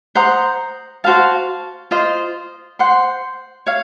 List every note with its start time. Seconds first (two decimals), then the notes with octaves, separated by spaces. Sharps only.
0.15 C5 F#5 A#5 D#6
1.04 F#4 C5 F5 A5
1.91 F4 C5 D#5
2.79 C5 F#5 C6
3.66 C#5 F5